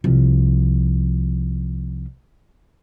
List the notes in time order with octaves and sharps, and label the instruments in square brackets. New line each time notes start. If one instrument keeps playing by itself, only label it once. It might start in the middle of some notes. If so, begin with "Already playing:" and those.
[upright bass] C2 F3